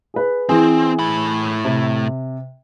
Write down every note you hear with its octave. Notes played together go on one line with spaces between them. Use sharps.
G#4 B4
E3 C4 G#4
A2 B5
C3